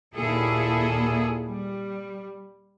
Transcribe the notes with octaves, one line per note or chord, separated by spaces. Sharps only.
D#2 A#2 A#3 E4 G#4 A4
G3